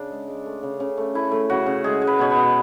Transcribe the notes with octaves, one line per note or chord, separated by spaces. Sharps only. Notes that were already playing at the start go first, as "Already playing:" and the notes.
Already playing: C#3 D4
G#3
G#3
A3
C#3
C#3
A3
A3 E4
A3
C#3 F#4
C#3
G#3 G#4
G#3
B4
B2 C#5
B4
B2